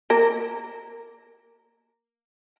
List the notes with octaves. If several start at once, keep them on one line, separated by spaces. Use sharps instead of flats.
A#3 A#4